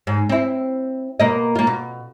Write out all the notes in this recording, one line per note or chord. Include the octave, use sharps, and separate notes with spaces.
G#2
C4 E4
B2 A#3 D#5
A#3 F4
B2